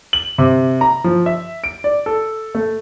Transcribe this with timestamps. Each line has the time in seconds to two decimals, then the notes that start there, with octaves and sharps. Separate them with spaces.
0.13 F#7
0.38 C3
0.81 A#5
1.04 F3
1.26 E5
1.64 D7
1.84 D5
2.06 A4
2.55 A3